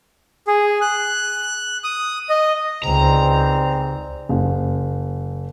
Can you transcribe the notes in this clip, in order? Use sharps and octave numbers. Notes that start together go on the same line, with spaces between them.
G#4
F#6
D#6
D#5
C#2 G#2 G3 C4 A#5
F#1